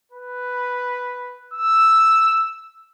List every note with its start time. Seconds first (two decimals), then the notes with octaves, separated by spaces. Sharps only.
0.12 B4
1.54 E6